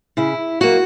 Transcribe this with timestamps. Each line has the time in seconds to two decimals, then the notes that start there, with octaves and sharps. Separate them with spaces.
0.17 C#3 E4
0.60 F#3 A#3 F#4